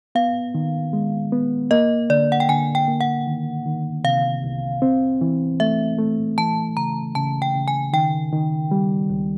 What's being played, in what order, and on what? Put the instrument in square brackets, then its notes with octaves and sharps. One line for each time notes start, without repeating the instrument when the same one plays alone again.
[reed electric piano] B3 [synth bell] F5
[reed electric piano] D#3
G#3
B3
[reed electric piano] A#3 [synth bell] D#5
[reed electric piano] D3 [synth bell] D5
[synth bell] F#5
G5
[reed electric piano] D3 [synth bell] G#5
[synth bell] G5
[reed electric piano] A#3
[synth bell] F#5
[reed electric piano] D#3
D#3
[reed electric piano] C3 [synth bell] F5
[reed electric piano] C2
C4
E3
[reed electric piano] A3 [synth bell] E5
[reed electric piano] A3
[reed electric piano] E3 [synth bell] A5
[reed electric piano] C#3 [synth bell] A#5
[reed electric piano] C#3 [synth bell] A5
[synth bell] G5
[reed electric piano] C#3
[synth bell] G#5
[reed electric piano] D#3 [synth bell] G5
[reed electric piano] D#3
G3
C#2